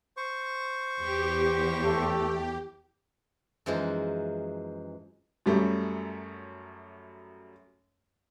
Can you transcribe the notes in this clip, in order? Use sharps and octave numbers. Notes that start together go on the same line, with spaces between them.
C5 C#6
E2 G4
A3
F#2 E3 F3 G#3 D#4
F#2 F#3 G3 A3